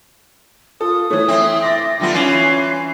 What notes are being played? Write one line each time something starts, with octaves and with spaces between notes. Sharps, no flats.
F4 A4 D#6
E3 A3 C#5
C4 E5
C6 D6 A6 A#6
D3 G3 B3 F4
E3 C#4 F4 C7